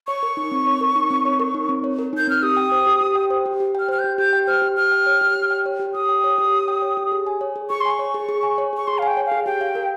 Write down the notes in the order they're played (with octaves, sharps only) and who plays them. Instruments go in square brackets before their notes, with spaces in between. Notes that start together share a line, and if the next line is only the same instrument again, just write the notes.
[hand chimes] C#5 [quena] C#6
[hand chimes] A#4
D#4
C4
C#5
A#4
D#4
C4
C#5
A#4
D#4
C4
C#5
A#4
[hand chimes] D#4 [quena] G6
[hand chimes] C4 [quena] F6
[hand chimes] G4 [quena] D#6
[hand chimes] G5
C5
G4
G4
G5
C5
G4
G4
[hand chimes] G5 [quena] F6
[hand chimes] C5 [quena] F6
[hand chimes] G4 [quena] G6
[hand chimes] G4 [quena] G6
[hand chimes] G5
[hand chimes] C5 [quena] F6
[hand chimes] G4
[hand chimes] G4 [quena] F6
[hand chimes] G5
C#5
G4
G4
G5
C#5
G4
[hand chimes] G4 [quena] D#6
[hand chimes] G5
C#5
G4
G4
G5
C#5
G4
G#4
G#5
C#5
G#4
[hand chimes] G#4 [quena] C#6
[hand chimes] G#5 [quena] C6
[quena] C#6
[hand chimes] C#5
G#4
G#4
G#5
C#5
[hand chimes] G#4 [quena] C#6
[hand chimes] G#4 [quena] C6
[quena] F5
[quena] G5 [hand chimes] G#5
[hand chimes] C#5
[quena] F5
[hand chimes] G#4
[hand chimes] G4 [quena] G5
[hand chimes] F5
A#4